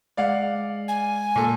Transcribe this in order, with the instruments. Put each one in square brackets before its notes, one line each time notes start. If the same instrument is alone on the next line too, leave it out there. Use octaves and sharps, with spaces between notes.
[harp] G#3 [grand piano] D5 F5 F#5
[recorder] G#5
[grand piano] A#2 A4